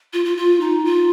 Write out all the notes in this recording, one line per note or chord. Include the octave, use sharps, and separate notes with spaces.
F4
F4
F4
D#4
F4